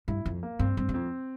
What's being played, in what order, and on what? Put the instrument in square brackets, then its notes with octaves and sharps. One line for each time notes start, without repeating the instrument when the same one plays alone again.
[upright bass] G2 [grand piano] E4
[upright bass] F2
[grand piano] A#3
[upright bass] G2 [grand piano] C4
[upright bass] G2 [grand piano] C4
[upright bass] G2
[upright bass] F2 [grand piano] C4